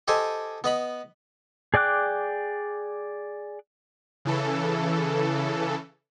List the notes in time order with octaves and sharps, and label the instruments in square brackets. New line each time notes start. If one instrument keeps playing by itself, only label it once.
[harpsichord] G4 A4 C5 D#5 G#5
B3 D#5 B5
[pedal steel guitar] G#4 D5 G5 D6 F#6
[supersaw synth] C#3 E3 A4